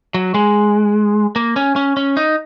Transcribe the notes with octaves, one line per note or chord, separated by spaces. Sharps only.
F#3
G#3
A#3
C#4
C#4
C#4
D#4